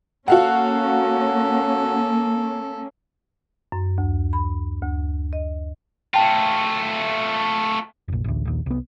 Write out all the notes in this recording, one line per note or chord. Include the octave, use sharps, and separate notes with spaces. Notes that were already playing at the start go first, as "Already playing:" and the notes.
A#3 C#4 F#4 A4 F5 F#5
F#2
D2
B5
D2
D#5
A3 F4 G5 A5
F1 A#1
A1 D2
A#1 D#2
C2 B3